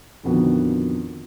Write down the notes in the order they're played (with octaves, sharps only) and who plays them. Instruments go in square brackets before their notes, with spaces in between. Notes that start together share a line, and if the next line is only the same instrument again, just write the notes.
[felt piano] F2 A#2 D3 D#3 B3 F#4